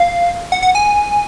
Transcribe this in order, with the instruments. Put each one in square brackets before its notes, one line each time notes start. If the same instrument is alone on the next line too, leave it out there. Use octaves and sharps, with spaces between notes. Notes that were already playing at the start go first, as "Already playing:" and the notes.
Already playing: [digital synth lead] F5
F#5
F#5
G#5